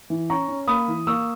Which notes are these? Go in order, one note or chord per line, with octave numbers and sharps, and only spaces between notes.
E3
C#4 A#5 C#6
C#4
A#3 B5 D#6
E3
A#3 C#6 E6